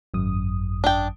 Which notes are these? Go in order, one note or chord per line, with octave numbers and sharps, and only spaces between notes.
G#1 F#2 D#6
D4 G5